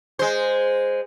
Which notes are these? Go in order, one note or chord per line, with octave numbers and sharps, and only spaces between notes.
G#3 C5